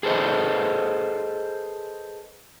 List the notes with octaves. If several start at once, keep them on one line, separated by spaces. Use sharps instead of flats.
G#4 A4 B4 C5 D#5